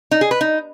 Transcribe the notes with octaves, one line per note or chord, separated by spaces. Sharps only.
D#4
G#4
B4
D#4